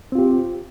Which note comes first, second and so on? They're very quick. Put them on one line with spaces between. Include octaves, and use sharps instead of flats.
C4 F4 G4